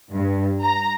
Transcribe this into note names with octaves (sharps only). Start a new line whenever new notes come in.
G2
A#5